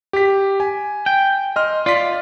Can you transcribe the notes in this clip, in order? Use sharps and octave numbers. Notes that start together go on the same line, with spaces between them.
G4 B6
G#5
G5
D#5 C6 F6
F4 D5 B6